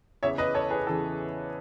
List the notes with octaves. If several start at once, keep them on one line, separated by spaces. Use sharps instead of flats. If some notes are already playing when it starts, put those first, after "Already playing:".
E2 C#3 E3 C#5 E5
B4 D#5
A4 C#5
G#4 B4
E2 C#3 E3 A4